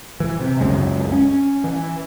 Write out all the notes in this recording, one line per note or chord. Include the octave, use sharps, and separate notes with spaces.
E3
C3
C#2 F#2 C#3 G#3
C#4
E3